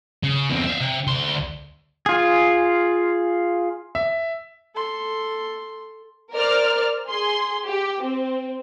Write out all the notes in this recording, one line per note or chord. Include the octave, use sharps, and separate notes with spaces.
C#3
E2 C4
E5 F5
C3
D2 C6
F4 G#4
E5
A4 C6
A#4 C5 D5 F6
G#4 C6
G4
C4